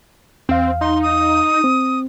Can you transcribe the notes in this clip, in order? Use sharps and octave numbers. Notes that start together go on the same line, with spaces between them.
E2 C4 F5
D#4 C6
D#6
C4